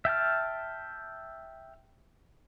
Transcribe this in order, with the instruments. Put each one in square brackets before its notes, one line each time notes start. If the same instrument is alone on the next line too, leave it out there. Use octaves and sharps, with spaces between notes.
[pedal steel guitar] E5 G5 A5 F6